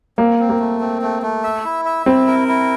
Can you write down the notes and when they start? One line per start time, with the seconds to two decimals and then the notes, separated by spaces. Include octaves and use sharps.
0.18 A#3 C4
0.39 C4
0.49 A#3
0.60 A3
0.81 C4
1.02 A3
1.23 A3
1.44 E5
1.65 E4
1.85 E5
2.06 C4 E4
2.27 A#4
2.48 E4